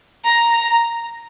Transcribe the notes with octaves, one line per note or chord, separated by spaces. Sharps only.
A#5